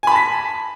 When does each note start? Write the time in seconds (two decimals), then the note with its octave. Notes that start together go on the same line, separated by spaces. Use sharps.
0.03 G#5
0.07 B5
0.12 A5
0.16 B6